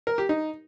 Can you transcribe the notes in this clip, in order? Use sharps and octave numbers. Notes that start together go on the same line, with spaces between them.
A#4
G4
D#4